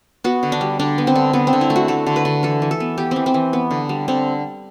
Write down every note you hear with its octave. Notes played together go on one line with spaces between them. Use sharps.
B3 F#4
D3
D4
G3
D3 D4
B3
C4
D3
D3 B3
C4
D3
E4
A3
F#4
A3 A4
D3
B4
D3
E3 A4
E3
A4
B3
B3 G4
E3 C4
C4
E3
B3
D3
G3
D3 C4